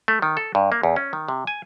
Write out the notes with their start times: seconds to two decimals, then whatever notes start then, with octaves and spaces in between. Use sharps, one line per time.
0.08 A3
0.22 D#3
0.37 A4
0.55 G2
0.72 A#3
0.83 E2
0.96 C#4
1.13 D#3
1.28 C3
1.47 G#5